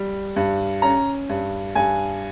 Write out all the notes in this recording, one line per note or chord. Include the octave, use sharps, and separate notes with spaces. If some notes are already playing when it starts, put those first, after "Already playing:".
Already playing: G3
G2
C#4 A#5
G2
G2 G#5